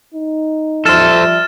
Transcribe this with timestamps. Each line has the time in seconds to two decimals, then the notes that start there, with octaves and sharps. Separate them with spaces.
0.14 D#4
0.85 F3 G3 A4 C5 E5 F6 A6 E7